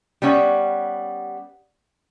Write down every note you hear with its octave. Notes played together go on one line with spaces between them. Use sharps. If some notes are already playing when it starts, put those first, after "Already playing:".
G3 B3 C#4 F#5